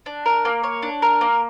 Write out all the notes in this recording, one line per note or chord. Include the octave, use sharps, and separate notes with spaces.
D4
A#4
A#3
C#5
D4
A#4
A#3